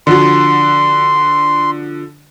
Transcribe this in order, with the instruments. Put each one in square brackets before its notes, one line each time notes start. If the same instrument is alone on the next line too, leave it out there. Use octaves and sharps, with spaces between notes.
[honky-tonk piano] D3 F3 F#4 [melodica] C6